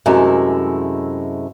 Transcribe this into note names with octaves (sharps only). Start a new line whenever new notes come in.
F#2 C3 G#3 A3 E4